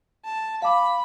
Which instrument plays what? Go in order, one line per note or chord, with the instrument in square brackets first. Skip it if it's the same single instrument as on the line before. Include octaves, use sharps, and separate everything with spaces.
[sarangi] A5
[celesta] F5 A5 D6 [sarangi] B5